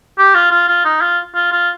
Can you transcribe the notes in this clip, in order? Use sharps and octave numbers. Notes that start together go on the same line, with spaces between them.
G4
F4
F4
F4
D#4
F4
F4
F4